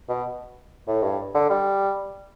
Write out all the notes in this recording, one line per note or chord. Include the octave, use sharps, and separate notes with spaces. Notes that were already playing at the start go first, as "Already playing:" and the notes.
B2
A2
G2
D3
G3